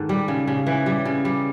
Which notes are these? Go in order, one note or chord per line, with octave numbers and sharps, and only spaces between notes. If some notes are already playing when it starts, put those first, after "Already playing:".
Already playing: G#2 D#3 A4
G3
C#3
C#3
E3
G3
C#3
G3